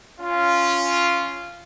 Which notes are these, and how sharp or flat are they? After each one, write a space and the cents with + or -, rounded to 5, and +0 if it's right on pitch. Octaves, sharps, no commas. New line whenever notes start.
C#4 +5 F4 -10